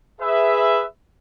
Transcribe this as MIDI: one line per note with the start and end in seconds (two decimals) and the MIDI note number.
0.21 0.85 68
0.21 0.85 71
0.21 0.85 76